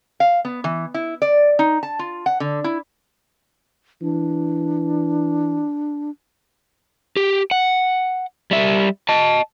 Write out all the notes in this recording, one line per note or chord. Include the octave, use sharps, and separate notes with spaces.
F5
B3
E3
E4
D5
D#4
A5
F4
F#5
D3
E4
E3 D4
G4
F#5
G3 E5
D#5 A5